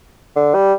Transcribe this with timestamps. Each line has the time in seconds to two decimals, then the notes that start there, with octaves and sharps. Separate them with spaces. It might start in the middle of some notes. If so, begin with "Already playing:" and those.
0.36 D3
0.54 G3